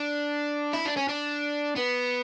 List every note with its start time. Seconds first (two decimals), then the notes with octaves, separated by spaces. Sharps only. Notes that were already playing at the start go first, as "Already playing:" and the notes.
Already playing: D4
0.74 E4
0.86 D4
0.97 C#4
1.09 D4
1.76 B3